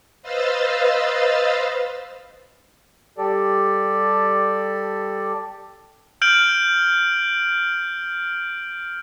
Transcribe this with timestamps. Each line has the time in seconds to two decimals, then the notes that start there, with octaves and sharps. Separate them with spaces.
0.22 B4 C5 D#5 F5 E6 A6
3.18 G3 G4 A4 D5
6.22 F6 G6 D7 F#7